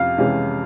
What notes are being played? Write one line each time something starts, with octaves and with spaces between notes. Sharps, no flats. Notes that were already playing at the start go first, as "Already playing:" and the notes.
Already playing: F2 C3 C#4 F5
C3 E3 G#3 C#4